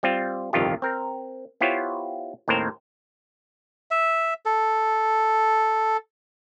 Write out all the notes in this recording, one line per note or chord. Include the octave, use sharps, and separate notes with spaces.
G3 C4 F4
G1 C2 F2 D#3 F4 G4
C4 A#4
B3 E4 F4 G4 C5 C#5
D#2 A2 C4 A#4 C5
E5
A4